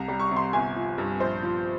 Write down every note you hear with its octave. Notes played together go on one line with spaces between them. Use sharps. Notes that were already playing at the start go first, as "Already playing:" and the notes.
Already playing: C2 A#5
G3
C#6
C3
C6
G1 G#5
F3
G2
A#1 C5
F3